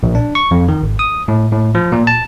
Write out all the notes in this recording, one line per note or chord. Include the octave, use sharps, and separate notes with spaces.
A#1
D4
C#6
F2
D#3
G#1
D#6
A2
A2
F3
A#2
A5